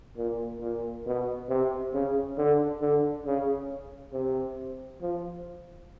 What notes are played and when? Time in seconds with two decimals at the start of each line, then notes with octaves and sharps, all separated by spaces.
0.17 A#2
0.61 A#2
1.06 B2
1.49 C3
1.94 C#3
2.38 D3
2.81 D3
3.26 C#3
4.13 C3
5.02 F3